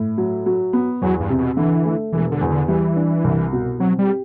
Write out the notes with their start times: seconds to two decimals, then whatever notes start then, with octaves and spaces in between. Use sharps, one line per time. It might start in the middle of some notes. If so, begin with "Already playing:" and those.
Already playing: A2
0.18 F#3
0.46 F#3
0.73 B3
1.02 E2 F#3
1.20 G2
1.29 C3
1.39 B2
1.57 D3 E3
1.85 A3
2.13 E1 E3
2.32 D3
2.41 E2
2.50 D3
2.68 E3 G3
2.96 D4
3.24 C2
3.53 B2
3.79 F#3 C4
3.99 G3
4.07 G4